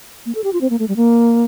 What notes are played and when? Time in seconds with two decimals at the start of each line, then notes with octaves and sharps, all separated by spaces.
0.26 A#3
0.35 A4
0.44 G4
0.53 F4
0.61 C4
0.70 A#3
0.79 A3
0.88 G3
0.96 A#3